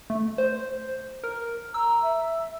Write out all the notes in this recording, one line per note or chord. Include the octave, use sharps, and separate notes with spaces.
A3
C5
A#4
A#5 E6
E5